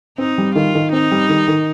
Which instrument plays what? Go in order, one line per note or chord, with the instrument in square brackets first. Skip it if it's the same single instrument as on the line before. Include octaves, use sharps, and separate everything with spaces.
[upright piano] C4 [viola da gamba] D#4
[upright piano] G3
[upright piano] D#3 [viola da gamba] F4
[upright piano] D#3
[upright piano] C4 [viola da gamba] D#4
[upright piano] G3
D#3
D#3